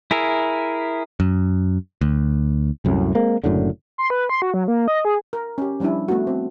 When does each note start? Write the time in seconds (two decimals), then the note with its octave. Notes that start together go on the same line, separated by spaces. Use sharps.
0.11 E4 G#4 A#4 E5
1.20 F#2
2.01 D2
2.85 C2 F#2 A2
3.15 G#3 A#3 C4
3.44 F#1 F#2 A2 D3
3.98 C6
4.10 B4
4.29 C6
4.42 F#4
4.54 F#3
4.68 A#3
4.88 D#5
5.05 G#4
5.33 A#4
5.58 C#4 G4
5.80 F3 G3 C#4 D4 E4
6.08 A3 B3 E4 F#4
6.27 C4